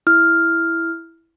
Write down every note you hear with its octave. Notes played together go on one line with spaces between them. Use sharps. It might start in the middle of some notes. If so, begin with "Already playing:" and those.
E4 F6